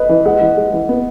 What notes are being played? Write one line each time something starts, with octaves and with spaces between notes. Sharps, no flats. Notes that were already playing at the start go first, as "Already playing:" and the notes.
Already playing: A4 B4 D#5
E3
G#3 D#5 F#5
E3
G#3
E3
B3